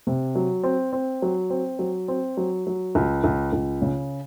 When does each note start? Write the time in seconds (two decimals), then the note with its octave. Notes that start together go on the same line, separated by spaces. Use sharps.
0.07 C3
0.35 F#3
0.63 C4
0.93 C4
1.22 F#3
1.50 C4
1.79 F#3
2.08 C4
2.37 F#3
2.67 F#3
2.95 C#2
3.24 C#2
3.53 C#2
3.82 C#3